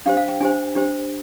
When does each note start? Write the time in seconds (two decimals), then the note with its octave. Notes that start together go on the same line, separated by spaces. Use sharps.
0.06 D4 G4 C5 F5
0.17 F5
0.28 G5
0.40 D4 G4 C5 G#5
0.75 D4 G4 C5